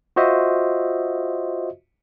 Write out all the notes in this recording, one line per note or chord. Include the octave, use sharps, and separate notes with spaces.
F4 F#4 C5 D#5 E5